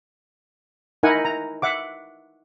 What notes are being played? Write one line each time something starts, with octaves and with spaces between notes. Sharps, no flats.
D#4 E4 A#4 F#5 G#5
A#5
E5 F#5 D6